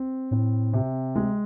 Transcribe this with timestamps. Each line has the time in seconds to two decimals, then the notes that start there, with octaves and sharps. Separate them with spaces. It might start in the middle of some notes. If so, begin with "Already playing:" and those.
Already playing: C4
0.31 A2 C4
0.73 C3
1.15 G#3